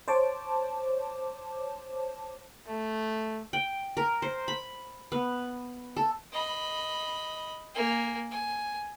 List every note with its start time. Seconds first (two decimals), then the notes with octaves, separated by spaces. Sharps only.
0.08 C5 C#5 A5 D6
2.67 A3
3.53 G5
3.97 A#4
4.22 C5
4.48 B5
5.12 B3
5.96 A4
6.32 D#5 B5
7.74 A#3 G#5
8.31 G#5